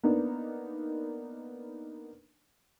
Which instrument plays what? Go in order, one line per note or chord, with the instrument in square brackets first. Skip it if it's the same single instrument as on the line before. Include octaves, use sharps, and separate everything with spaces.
[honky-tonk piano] A#3 B3 D4 D#4